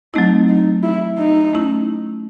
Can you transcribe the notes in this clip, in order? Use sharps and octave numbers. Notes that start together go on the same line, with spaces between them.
F#3 A3 C4 D#4 E4
D#4
E4
D#4
A3 C#4 E4